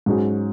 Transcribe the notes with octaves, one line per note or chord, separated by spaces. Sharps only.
G#2 F#3 C#4 G#4